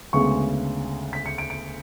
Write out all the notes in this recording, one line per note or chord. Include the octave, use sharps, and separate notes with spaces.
D2 C#3 G#3 B3 C#6
B6
C#7
D7
D7